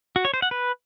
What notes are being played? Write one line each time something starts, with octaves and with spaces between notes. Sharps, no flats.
F#4
C#5
C5
F#5
B4